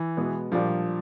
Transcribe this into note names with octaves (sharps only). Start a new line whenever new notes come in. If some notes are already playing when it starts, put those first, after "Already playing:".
Already playing: E3
B2 G#3 B3
A#2 F3 G3 A#3 D4